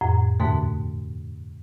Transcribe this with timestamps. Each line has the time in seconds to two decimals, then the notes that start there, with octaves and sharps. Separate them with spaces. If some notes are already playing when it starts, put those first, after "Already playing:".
0.01 F2 A2
0.40 D#2 G#2 B2 D3 A3